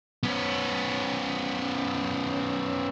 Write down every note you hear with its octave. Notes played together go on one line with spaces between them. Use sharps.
B3 C#4